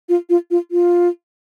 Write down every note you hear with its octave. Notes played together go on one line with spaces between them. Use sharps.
F4
F4
F4
F4